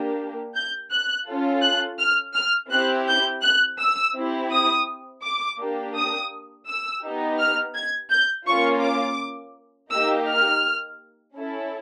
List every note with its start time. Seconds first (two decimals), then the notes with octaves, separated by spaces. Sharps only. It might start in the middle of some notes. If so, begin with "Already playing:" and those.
Already playing: A#3 D4 G4
0.55 G6
0.90 F#6
1.27 C#4 F4 A4
1.63 F#6
1.99 F6
2.35 F6
2.71 C4 E4 G4 F#6
3.07 G6
3.42 F#6
3.79 E6
4.15 C4 E4 G4
4.51 D#6
5.23 D6
5.59 A#3 D4 G4
5.96 D#6
6.68 E6
7.03 B3 D#4 G4
7.39 F6
7.75 G#6
8.11 G6
8.47 A#3 C#4 F4 C#6
8.83 D6
9.91 A#3 D#4 G4 E6
10.27 F6
11.36 C#4 E4 A4